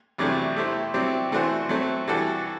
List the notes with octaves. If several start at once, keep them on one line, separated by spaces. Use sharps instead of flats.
E2 C3 F#3 A3 D4
A3 E4 G4 C5
F#3 C4 E4 G4 D5
E3 A3 D4 F#4 C5
F#3 A3 C4
E3 G3 D4 F#4 A4